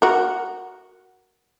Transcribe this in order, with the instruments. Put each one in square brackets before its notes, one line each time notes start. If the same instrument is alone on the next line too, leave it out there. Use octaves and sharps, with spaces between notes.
[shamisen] F#4 A#4